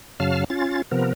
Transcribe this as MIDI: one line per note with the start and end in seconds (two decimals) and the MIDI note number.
0.20 0.44 42
0.20 0.44 49
0.20 0.44 54
0.20 0.44 77
0.20 0.44 81
0.20 0.44 89
0.50 0.82 61
0.50 0.82 65
0.50 0.82 93
0.91 1.13 48
0.91 1.13 53
0.91 1.13 59
0.91 1.13 70